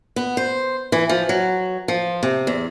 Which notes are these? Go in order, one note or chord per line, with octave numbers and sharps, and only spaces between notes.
B3
C5
E3
F3
F#3
F3
C3
E2